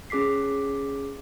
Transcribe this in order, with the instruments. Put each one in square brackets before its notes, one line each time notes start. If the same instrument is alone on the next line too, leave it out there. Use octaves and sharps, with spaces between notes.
[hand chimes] C#4 G#4 D6 B6 C7